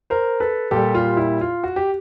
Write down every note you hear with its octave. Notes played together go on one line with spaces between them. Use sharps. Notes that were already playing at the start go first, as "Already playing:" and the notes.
A#4 C5
A4 B4
A#2 G3 G4 A4
F4
E4
F4
F#4
G4